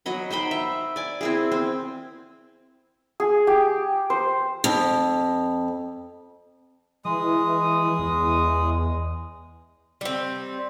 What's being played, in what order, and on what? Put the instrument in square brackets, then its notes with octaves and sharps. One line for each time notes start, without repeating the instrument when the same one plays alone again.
[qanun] F#3 D#5 B5
D#4 C5 G5 B5
E5
D5 G#5
C4 E4 G#4
C4
[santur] G#4
G4
C5
[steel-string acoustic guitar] F2
[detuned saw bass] E3 [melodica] G#3 D#6
[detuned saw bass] E2
[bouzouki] G3 C4